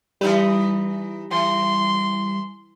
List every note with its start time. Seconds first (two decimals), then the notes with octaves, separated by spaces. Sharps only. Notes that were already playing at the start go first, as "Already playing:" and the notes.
0.21 E3 G3 D#4 B4
1.31 E3 C6